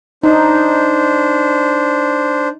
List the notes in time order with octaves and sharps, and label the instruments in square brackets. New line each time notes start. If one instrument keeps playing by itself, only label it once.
[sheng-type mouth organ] D4 C5 [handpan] D#4